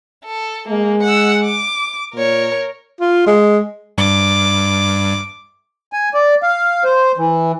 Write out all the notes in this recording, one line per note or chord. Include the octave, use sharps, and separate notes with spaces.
A4
G#3 A#3
F#5 E6
D6
A#2 A#4 C#5
F4
G#3
G2 D6
G#5
D5
F5
C5
E3